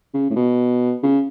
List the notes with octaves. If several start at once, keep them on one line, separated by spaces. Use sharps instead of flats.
C#3
A2
B2
C#3